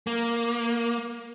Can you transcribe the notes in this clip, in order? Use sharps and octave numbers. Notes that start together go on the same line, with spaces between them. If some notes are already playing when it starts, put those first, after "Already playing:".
A#3